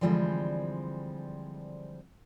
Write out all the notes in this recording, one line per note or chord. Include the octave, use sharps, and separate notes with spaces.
D3 E3 F3 G3 G#3 C4